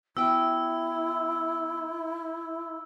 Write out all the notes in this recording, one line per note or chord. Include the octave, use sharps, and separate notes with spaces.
B3 E4 F#4 G5 E6